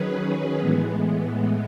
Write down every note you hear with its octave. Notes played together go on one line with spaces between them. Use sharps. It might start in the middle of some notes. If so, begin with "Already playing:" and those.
Already playing: D#3 F#3 C#4 G#4 B4
A2 E3 G#3 B3